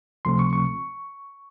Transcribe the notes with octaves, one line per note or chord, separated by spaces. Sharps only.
C#2 C3 F3 A3 C4 C6
C#6
C#6